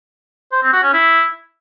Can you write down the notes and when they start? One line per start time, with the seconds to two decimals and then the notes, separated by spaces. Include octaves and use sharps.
0.52 C5
0.62 C4
0.73 F#4
0.83 C#4
0.93 E4